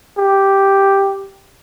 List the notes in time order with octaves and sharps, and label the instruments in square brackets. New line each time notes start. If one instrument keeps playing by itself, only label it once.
[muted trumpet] G4